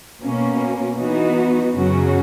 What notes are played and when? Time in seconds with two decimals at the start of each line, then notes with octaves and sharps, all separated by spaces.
0.22 B2 A#3 C#4
0.97 E3 B3 D#4 F#4
1.74 F#2 C#3 F#3 C#4 F#4